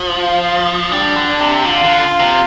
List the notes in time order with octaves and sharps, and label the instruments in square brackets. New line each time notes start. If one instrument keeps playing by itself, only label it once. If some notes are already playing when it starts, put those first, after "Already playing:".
Already playing: [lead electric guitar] F3
[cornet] F4
[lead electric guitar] G3 [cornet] D4
[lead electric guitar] D3
[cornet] D4
[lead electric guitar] C3
[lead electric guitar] D3 [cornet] F4
[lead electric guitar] D3
C3